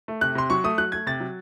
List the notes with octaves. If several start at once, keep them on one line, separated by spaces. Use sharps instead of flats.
A3
C3 F#6
C3 C6
F#3 C#6
A3 D#6
F#3 F#6
A3 G#6
C3 A6
F#3